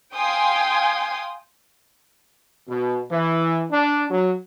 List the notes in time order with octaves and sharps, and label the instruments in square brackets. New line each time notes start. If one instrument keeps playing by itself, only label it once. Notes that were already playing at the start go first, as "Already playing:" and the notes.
[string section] F5 G5 G#5 C6 D#6
[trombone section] B2
E3
D4
F#3